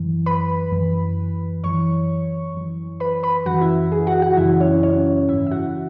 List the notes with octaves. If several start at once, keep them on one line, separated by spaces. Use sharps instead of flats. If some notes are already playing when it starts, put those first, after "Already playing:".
Already playing: F#2 E3
B4 B5
F#2 E3
F#2 E3 C#5 C#6
F#2 E3
B4 B5
B4 B5
F#2 C#3 E3 F#4 F#5
E4 E5
G#4
F#4 F#5
F#4 F#5
F#2 C#3 E3 E4 E5
C#4 C#5
C#4 C#5
G#2 E3 E4 E5
E5
F#4 F#5